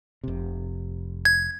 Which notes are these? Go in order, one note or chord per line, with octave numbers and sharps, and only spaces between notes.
F1 C3
G#6